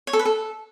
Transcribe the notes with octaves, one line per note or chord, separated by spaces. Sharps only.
C#5
A4
B4
A4